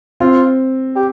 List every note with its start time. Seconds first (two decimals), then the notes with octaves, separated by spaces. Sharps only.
0.20 C4 F4
0.96 G4